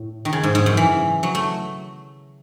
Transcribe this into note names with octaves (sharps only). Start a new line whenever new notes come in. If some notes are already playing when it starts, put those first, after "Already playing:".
Already playing: A2
D#3
C#3
G#2
G#2
F#2
E3
F#3
A3